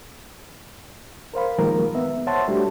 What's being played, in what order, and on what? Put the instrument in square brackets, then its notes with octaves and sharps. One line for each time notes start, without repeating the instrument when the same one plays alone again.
[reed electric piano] A#4 C5 F5 B5
D#3 F3 F#3 G#3 A#3 A#4
B3 E5
C5 C#5 E5 F#5 A5 C6
G3 A3 D4 F#4 G4